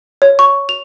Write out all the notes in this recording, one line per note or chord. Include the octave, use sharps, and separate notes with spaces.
C#5
C#6
F7